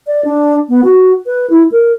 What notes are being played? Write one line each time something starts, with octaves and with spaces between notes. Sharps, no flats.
D5
D4
B3
F#4
B4
E4
A#4